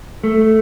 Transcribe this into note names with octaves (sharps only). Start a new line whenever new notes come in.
A3